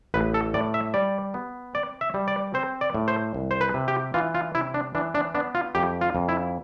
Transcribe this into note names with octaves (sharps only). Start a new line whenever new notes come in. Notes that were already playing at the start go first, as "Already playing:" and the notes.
A1 B4
A4
A2 D5
E5
G3 D5
B3
C4 D5
E5
G3
D5
C4 C5
D5
A2
C5
C2
C5
B4
C3
G4
E3 F4
F4
C3 E4
D4
E3 D4
D4
B3 D4
F4
F2 G4
F4
F2
E4